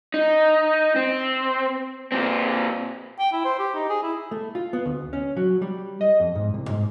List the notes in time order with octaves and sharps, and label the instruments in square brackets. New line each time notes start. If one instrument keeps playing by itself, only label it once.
[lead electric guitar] D#4
C4
A#2 C4
[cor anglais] G5
E4
C5
G4
D#4
G#4
E4
[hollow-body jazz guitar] A3
F4
B3
D2
C#4
F#3
G3
D#5
F2
G#2
C2
G#2